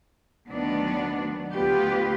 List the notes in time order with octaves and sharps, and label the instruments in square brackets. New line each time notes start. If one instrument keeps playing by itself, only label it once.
[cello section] D2 D#3 F#3 B3 D4
D2 B3 F4 G4 B4